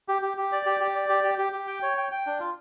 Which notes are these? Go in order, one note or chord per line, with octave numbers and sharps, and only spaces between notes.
G4
G4
G4
D5
G4
G4
D5
G4
G4
G4
G4
G5
C#5
G5
G5
D4
F4